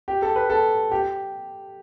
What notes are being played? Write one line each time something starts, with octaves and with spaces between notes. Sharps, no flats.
G4
A4
B4
A4
G4